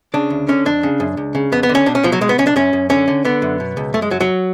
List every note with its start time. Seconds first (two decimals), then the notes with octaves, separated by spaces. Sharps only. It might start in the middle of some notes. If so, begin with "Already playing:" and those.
0.14 C#3 D4
0.30 D2
0.48 D3 C#4
0.66 F2 D4
0.83 C#3
1.00 F#2
1.17 C#2
1.35 C#3
1.52 F2 B3
1.63 B3
1.69 D3
1.75 C#4
1.86 B2 D4
1.95 C#4
2.03 B2 F3
2.12 F#3
2.21 B1 G#3
2.29 B3
2.38 B1 C#4
2.47 D4
2.56 F#2 C#4
2.73 F#2
2.90 D3 C#4
3.08 D3
3.25 D3 B3
3.42 F#2
3.60 B2
3.77 C#2
3.94 F#2 A3
4.02 G#3
4.10 F#2 F#3
4.21 F#3